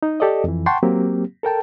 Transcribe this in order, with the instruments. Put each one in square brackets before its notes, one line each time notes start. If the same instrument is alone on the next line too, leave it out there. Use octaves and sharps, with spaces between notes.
[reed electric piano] D#4
G4 A4 D5 D#5
F2 E3
F#5 G5 A5 C6 C#6
F#3 A#3 C4 G4
A4 A#4 G5 A5